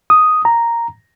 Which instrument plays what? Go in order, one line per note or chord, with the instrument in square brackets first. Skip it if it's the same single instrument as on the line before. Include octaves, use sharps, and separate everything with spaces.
[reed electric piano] D#6
A#5